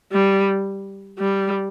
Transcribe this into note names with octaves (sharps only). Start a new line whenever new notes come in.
G3
G3